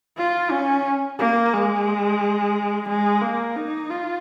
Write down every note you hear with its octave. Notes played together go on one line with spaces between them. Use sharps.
F4
C#4
A#3
G#3
G#3
A#3
D#4
F4